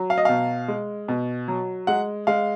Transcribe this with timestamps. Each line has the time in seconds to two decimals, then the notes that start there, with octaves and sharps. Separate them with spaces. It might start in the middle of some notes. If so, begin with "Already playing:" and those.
Already playing: F#3
0.10 F5
0.18 D#5
0.25 B2 F5
0.68 G#3
1.08 B2
1.48 F#3
1.87 G#3 F#5
2.27 G#3 F5